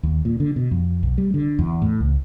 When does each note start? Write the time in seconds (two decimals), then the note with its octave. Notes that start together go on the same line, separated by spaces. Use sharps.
0.03 D#2
0.25 A#2
0.40 D3
0.56 B2
0.71 F2
1.03 B1
1.18 G3
1.34 D3
1.59 E2
1.82 A2
2.00 C#2